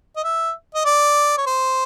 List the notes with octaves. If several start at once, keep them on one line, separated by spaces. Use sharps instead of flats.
D#5
E5
D#5
D5
C#5
C5